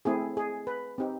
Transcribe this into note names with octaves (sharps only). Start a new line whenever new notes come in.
A3 C4 E4 G#4
G#4
B4
C4 D#4 G4